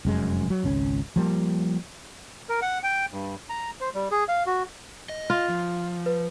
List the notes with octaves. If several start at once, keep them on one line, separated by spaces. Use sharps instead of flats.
F1 F#2 G#3
F#3
G#1 C#2 C#4
F3 G3 A#3
A#4
F#5
G5
G2
A#5
C5
G3
G#4
F5
F#4
D#5
F4
F3
B4